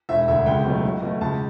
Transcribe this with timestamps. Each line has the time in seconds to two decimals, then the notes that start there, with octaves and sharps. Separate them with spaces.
0.09 E1 E5
0.28 D2 D3 E5
0.46 C#2 G5
0.65 B2 F#3 A3
0.83 B1
1.02 B2 A3
1.21 C#2 A5